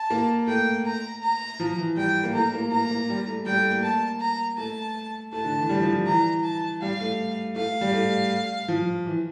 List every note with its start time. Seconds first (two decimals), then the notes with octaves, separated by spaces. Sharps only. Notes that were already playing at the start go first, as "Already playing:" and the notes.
Already playing: A5
0.10 A#3
0.47 A3 G5
0.86 A#5
1.23 A#5
1.60 F3
1.78 E3
1.96 G3 G5
2.23 A#3
2.34 A3 A#5
2.53 A#3
2.71 A#3 A#5
2.91 A#3
3.09 G3
3.27 A3
3.46 G3 G5
3.59 A3
3.70 A#3
3.83 A5
4.20 A#5
4.58 A3 A5
5.33 A3 A5
5.45 D3
5.58 E3
5.69 G3
5.82 F3
6.07 E3 A#5
6.44 A5
6.82 G3 F5
7.00 A3
7.56 A3 F5
7.81 G3
7.93 A3
8.68 F3
9.06 E3